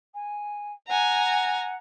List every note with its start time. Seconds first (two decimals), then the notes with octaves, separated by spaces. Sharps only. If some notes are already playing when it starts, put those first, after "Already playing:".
0.14 G#5
0.88 F#5 G#5 A#5